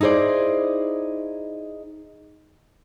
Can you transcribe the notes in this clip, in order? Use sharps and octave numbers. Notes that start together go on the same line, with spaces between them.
D#4 E4 G#4 C5 D5